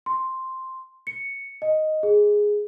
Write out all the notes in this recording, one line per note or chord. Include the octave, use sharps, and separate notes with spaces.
C6
C#7
D#5
G#4